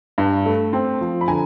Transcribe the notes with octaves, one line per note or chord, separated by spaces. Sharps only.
G2
A3
C4
F3
B5
D3 G#5 A#5